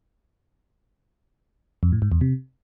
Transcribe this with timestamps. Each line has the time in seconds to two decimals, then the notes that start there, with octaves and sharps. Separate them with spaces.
1.83 F2
1.92 A2
2.02 G#2
2.12 E2
2.21 C3